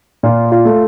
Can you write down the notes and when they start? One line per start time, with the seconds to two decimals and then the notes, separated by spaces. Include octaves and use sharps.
0.23 A#2 F4
0.52 F4
0.65 A3